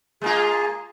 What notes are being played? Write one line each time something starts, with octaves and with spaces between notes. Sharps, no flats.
G#3 A#3 F4 G#4